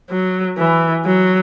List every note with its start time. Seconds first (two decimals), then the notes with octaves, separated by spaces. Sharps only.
0.10 F#3
0.58 E3
1.06 F#3